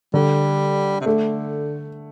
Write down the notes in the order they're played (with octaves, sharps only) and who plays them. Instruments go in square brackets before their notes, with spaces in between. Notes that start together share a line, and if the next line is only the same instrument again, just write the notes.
[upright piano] D3 [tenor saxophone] G3
[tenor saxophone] C3
[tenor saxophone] D3 [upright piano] A3